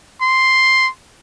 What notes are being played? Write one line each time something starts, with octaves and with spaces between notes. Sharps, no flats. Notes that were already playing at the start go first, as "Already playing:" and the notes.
C6